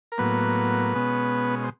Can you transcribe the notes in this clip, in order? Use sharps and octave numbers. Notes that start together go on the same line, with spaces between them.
A#4
A2 F#3 A#3 B3 B4
B2 G#3 C#4
C5